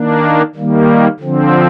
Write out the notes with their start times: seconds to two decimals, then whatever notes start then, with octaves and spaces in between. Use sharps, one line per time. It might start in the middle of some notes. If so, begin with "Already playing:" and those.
Already playing: D#3 A#3 D4
0.55 D#3 G3 A#3
1.20 D3 F3 C4